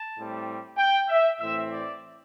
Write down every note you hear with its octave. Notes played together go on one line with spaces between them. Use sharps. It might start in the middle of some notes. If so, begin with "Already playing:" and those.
Already playing: A5
A2 G3 C4
G5
E5
A2 E3 C4 E5
D5